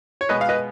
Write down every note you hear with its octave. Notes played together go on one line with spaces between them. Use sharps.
C#5
B2 G#3 B3 B4 D#5
F5
B4 D#5